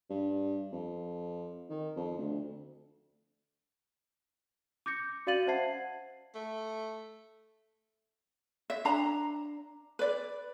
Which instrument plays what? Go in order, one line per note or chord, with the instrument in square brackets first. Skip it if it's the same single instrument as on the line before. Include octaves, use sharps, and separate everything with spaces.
[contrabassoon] G2
F2
D#3
F2
D2
[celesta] D6 G6 A#6 C#7
F#4 D5 F5 A6 D#7 F#7
C5 E5 F#5 A5 G#6 C7
[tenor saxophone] A3
[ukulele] E5
D4 A#5
B4 D5